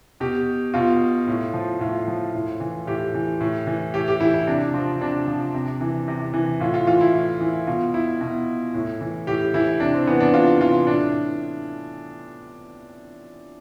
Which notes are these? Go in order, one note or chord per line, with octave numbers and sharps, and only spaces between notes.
B2 G4
B2 F4
A2
F3
A2 F4
F3
A2
E3
A2 G4
E3
A2
E3
A2 G4
G4
E3 E4
E4
C3 D4
F3 C4
C3 D4
F3
C3
E3
C3
E3
A2 F4
F4
E3 F4
E4
A2
E3
B2 F4
E4
B2
A2
E3
A2 G4
E3 E4
C3 D4
C4
E3 B3
D4
C3 F4
E3 F4
A2 D4